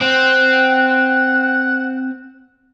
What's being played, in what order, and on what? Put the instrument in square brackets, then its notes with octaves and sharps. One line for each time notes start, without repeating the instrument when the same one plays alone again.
[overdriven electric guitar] C4 [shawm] F#5